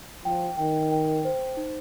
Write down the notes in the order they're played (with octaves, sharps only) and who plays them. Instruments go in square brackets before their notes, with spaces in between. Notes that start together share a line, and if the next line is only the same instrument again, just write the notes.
[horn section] F3 [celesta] G5
[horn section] D#3 [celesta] G5
[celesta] G5
C5
D#4